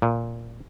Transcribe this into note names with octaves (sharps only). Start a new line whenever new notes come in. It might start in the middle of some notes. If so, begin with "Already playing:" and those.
A#2